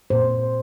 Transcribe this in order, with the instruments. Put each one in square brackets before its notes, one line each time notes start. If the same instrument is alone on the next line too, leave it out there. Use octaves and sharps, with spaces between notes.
[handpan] A#2 C5